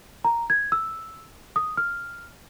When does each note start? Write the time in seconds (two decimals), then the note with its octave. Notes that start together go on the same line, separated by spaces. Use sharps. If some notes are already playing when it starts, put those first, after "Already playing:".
0.25 A#5
0.50 G#6
0.72 E6
1.56 D#6
1.77 F6